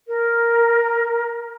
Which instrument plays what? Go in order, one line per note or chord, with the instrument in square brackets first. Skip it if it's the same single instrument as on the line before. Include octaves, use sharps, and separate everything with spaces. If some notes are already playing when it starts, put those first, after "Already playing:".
[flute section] A#4